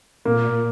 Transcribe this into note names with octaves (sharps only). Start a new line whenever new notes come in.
A#2 A#3